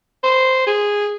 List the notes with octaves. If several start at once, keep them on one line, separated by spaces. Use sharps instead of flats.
C5
G#4